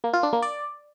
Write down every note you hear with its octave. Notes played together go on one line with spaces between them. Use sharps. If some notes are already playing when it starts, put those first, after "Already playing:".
A#3
F4
D4
A#3
D5